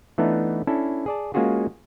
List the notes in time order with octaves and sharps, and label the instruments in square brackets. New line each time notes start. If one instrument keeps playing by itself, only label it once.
[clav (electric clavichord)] E3 A3 B3 D4 D#4
C#4 D4 E4 A4
G#4 D5 A5
G#3 A#3 C#4 F4 F#4 G#4